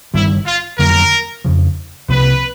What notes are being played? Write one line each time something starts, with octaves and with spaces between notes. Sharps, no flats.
G1 G2 D#3 G3 E4
F4
F2 D3 F#3 A#3 A#4
F2 C#3 F3
C2 C3 F3 A#3 B4